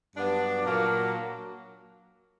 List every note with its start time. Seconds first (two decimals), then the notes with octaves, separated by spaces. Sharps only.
0.15 G2 F#3 B3 D4
0.64 A#2 F#3 A#3 D4